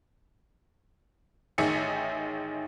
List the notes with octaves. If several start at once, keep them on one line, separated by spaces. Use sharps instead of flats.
A1 D#3 D#4 G#4 E5 C#7